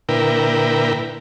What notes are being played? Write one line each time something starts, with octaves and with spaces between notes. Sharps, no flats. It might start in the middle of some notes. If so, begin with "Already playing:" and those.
A#2 D3 E4 A#4 B4 G5